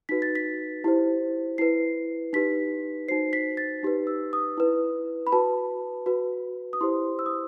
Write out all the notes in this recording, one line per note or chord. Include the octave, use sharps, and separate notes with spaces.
D#4 F#4 B4 B6
A6
B6
E4 G4 C5
E4 B4 C7
D#4 G4 B4 B6
D#4 F#4 C5 C7
B6
A6
D#4 G4 B4
E6
D#6
E4 B4
B5
F#4 B4 A5
F#4 B4
D#6
E4 G4 C5 C6
E6
D#6